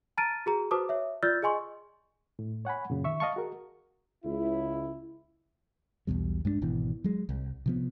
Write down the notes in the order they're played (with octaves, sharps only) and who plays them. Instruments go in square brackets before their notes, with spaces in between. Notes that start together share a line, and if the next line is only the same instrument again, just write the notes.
[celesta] A5 A#5 F6 A6 D7 D#7
F#4 G#4 A#5
F#4 B4 C5 A5 D6 D#6
C#5 E5
F4 D5 E6 F6 G6 A6
G#4 D#5 G#5 C6 C#6
[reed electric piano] A2
C#5 F#5 G#5 B5
F#2 A#2 C#3
D#3 E5 C#6
D#5 F5 A5 C#6
F#4 G#4 A#4
[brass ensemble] C#2 E4
[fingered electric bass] B1 E2 B2 G3
G2 G#3 C4 D4
G#1 B2 E3
F#3 G#3
C2
C3 F3 B3